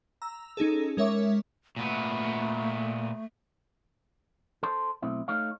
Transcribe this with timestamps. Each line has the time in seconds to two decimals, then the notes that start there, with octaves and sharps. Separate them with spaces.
0.22 A#5 E6
0.57 C#4 D#4 G#4 A4
0.97 G#3 A#4 C#5 E5 C#6 D6
1.76 A#2 A3 B3
4.63 A4 C5
5.02 B1 A3 C4 E4
5.28 A3 D#4 C#5 F5